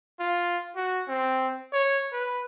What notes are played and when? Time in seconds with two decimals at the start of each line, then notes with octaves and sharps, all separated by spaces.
0.20 F4
0.76 F#4
1.08 C4
1.73 C#5
2.12 B4